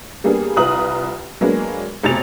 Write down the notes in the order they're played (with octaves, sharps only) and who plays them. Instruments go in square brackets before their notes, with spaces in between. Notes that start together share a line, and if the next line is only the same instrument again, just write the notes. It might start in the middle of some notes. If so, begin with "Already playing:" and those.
[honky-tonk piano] G3 A#3 B3 D4 G#4
C2 F4 B4 A#5 D#6 F#7
F#3 G#3 A#3 B3 D4
F1 B1 C3 A6 F7